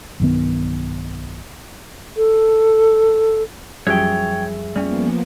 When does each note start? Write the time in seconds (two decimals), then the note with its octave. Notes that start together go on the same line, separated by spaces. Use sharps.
0.20 B1 G2 D#3 B3
2.17 A4
3.87 F#2 F3 G3 G#4 C#5 E5 G5
4.76 F3 G3 A#3 B3 C#4